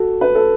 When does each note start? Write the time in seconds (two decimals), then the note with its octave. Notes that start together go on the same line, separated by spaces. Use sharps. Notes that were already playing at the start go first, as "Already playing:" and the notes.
Already playing: F#4 A4
0.21 B4
0.35 A4